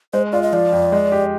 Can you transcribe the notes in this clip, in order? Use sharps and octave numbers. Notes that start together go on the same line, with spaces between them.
G#3 C5
F4 D5
D#5
F3 D5
F2
G#3
G4